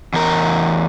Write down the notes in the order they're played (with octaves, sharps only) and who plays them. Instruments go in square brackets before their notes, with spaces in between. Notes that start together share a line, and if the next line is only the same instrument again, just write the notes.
[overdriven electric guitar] E2 A#4